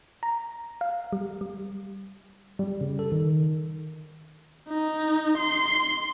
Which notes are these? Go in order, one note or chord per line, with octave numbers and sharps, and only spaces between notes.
A#5
F5
G3
G3
G3
C#3
A4
D#3
D#4
C6